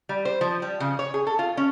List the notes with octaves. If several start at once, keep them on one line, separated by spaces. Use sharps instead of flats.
G3
C5
F3
G3
C#3
C#5
G#4
A4
F4
C#4